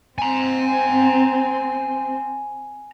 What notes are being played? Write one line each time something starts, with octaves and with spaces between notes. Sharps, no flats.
C4 G#5 A#5